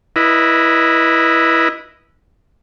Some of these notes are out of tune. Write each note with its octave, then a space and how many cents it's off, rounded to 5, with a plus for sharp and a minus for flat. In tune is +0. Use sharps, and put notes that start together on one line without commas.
E4 +0 B4 -25 D#5 +0